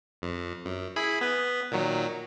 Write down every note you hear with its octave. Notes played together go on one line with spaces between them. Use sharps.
F2
F#2
E4 G#4 B5
B3 B4
A#2 D#3 F#3